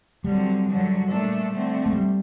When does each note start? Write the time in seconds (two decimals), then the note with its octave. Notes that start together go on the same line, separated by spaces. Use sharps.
0.24 D3 F#3 G3 C4
0.68 F#2 D3 F#3
1.08 A#2 A3 D4 A4
1.51 D3 A3 C4
1.86 A3
1.93 G3